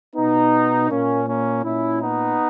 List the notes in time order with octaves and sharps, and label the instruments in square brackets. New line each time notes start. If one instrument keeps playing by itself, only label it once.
[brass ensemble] B2 B3 D#4
A#2 A#3 C#4
A#3 C#4
A#2 C#4 E4
B3 D#4